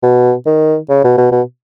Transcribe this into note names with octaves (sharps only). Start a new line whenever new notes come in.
B2
D#3
C#3
B2
B2
B2